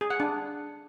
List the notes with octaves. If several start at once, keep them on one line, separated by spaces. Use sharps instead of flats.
G#4
F#5
D4